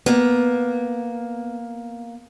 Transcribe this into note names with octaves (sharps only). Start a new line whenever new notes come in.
A#3 B3